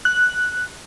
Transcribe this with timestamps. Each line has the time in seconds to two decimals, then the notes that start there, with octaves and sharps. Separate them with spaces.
0.05 F#6